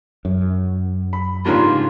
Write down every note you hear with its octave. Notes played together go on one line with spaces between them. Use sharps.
F#2
B5
G#2 C#3 G3 A#3 D4 F4